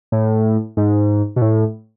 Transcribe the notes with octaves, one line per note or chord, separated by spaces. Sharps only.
A2
G#2
B2
A2